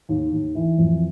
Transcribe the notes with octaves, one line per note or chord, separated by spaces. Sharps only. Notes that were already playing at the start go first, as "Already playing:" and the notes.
D#2
D#2
E3
F2